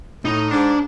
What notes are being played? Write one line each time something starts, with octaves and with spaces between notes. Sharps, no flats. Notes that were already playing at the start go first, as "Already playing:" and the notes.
A2 D#4
G#2 D4